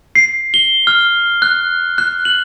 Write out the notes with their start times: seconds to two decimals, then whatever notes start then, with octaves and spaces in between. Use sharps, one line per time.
0.15 C7
0.54 G7
0.87 F6
1.42 F#6
1.98 F#6
2.25 F#7